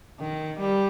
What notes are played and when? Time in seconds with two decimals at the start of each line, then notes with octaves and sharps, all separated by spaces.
0.20 D#3
0.60 G3